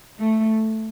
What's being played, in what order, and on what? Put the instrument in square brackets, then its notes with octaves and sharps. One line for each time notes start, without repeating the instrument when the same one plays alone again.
[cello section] A3